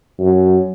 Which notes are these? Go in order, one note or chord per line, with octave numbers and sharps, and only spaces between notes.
F#2